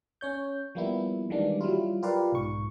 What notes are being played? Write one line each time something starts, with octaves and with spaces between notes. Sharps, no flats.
C#4 C#5 G6
F3 G3 A#3 B3 E4
D#3 E3 G3 G#3 A#3 D4
F#3 G3 E4 F4
F4 G4 A#4 B4 D5 F5
B1 G#2 C#6